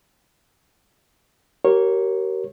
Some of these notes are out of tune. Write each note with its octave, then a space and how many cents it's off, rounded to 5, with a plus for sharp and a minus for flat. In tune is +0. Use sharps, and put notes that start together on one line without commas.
G4 -35 A#4 +0 C#5 -20